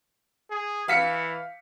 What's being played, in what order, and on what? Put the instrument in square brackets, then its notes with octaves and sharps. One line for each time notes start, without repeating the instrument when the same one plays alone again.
[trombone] G#4
[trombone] E3 [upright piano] F5 B6 C#7